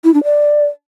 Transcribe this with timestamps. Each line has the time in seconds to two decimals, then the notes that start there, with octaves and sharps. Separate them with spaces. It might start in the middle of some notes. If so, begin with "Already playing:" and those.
0.04 E4
0.14 D4
0.24 D5